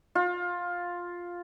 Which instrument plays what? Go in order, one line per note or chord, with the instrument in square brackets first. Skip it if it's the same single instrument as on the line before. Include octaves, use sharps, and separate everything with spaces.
[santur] F4